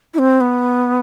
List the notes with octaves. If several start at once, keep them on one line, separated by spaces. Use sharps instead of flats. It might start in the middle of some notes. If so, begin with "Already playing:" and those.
E4
C4
B3